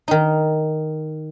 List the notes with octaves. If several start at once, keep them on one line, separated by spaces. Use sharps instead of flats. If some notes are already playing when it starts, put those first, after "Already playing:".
D#3 D#4